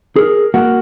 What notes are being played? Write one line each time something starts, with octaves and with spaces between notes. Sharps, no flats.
G#4 A#4
A#3 F#4 A#4 F#5